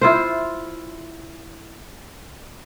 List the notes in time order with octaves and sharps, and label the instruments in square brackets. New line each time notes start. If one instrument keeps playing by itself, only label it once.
[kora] E4 F4 C5